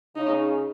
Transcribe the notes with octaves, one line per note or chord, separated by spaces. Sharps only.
C#3 D#4